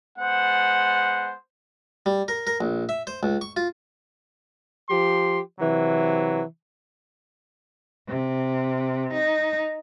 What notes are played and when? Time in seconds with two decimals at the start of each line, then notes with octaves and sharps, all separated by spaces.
0.19 G#3 B3 C5 F#5
2.06 G3
2.28 A#4
2.47 A#4
2.61 A#1
2.89 E5
3.07 C5
3.23 C#2
3.41 C#6
3.57 F4
4.90 F3 G4 C6
5.60 C3 E3 F#3
8.07 C3
9.12 D#4